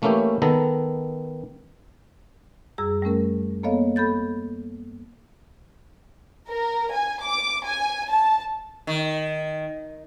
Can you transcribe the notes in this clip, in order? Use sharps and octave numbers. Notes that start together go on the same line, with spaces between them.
E3 A3 A#3 C#4 E4 G4
D#3 B3 A4 A#5
F#2 G3 G#4 E6
G3 A3 C#4 A#4
A#3 B3 A4 C#5 D#5 F5
A4 B5 G6 A6
A#4
G#5
D6
G#5
A5
D#3